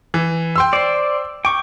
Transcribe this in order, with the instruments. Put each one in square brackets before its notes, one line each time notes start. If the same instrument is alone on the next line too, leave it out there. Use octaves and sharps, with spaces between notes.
[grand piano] E3
G5 C6 E6
[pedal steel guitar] C5 D5
[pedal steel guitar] G5 C#6 [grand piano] D6